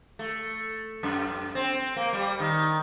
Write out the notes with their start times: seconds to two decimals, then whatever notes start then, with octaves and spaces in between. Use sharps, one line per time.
0.19 A3
1.03 F#2
1.55 C4
1.96 A#3
2.13 G3
2.40 D#3